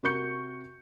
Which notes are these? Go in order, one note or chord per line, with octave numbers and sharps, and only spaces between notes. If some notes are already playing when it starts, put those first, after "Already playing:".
C3 F#4 A#4 C#6 G6 C#7